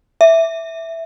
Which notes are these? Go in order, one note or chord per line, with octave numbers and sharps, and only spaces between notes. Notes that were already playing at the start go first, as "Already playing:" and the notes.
E5